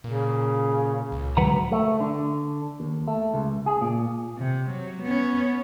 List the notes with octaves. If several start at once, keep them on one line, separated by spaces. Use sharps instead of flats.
A#2 C#3
C#2
D3 F#3 G#3 B4 F#5 A#5
A3
D3
D#2
A3
C#2
G#4
A#2
C3
F#3
B3 C#4